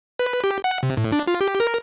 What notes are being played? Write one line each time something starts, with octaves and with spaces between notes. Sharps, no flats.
B4
G4
F#5
C3
A2
D4
F4
G4
A#4